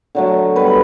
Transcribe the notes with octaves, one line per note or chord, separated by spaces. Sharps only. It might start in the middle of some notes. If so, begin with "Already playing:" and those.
D3 F#3 A3
B2 G3 B4